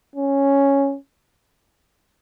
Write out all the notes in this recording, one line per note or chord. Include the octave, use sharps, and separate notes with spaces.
C#4